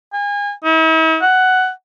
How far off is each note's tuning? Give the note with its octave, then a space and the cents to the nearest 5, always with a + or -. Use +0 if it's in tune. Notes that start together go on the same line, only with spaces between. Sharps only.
G#5 -35
E4 -45
F#5 +10